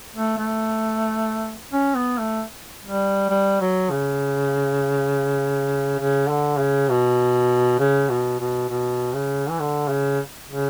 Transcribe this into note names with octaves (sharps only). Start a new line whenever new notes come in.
A3
A3
C#4
B3
A3
G3
G3
F#3
C#3
C#3
D3
C#3
B2
C#3
B2
B2
B2
C#3
E3
D3
C#3
C#3